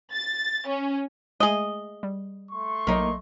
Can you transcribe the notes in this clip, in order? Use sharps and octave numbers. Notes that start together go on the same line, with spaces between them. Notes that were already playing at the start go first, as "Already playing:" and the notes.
A6
C#4
G#3 A3 G#4 D#5 E5
G3
A3 C6 C#6
A#1 F#3 A#3 D#4